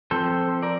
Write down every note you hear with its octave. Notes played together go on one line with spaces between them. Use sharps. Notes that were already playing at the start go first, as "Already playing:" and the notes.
F3 C4 A4 C5
A#4 D5